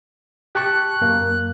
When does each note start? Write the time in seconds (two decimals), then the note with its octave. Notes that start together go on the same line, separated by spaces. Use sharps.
0.55 G4 A5 C#6 F#6
1.01 F#2 A#3